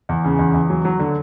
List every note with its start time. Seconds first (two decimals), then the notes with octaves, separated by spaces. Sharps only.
0.09 E2
0.24 C#3
0.39 E2
0.54 E2
0.70 F#3
0.85 F#3
0.99 D3